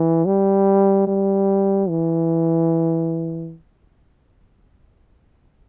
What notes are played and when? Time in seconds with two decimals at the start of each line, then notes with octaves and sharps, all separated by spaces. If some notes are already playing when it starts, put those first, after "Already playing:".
Already playing: E3
0.26 G3
1.07 G3
1.89 E3